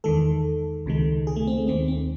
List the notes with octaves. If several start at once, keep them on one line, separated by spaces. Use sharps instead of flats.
E2 D#3 G#3 A4
C#2 C3 D#3 G#3
G#4
A3
C4
A3
D#2 D#3 G#3 C4
C4